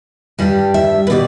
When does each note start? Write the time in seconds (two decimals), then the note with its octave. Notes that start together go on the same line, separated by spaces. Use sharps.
0.39 G2 G3 D4
0.74 E5
1.07 B4
1.10 B2 G3 D5